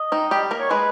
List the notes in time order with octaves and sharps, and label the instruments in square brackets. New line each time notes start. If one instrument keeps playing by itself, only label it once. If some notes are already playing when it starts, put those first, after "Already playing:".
Already playing: [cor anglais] D#5
[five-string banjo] D#3 D#4
G3 G4
A#3 A#4
[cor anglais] C#5
[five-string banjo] G#3 G#4 [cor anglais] B4